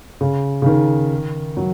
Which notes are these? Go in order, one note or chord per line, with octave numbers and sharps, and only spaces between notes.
C#3
C#3
D#3
F#3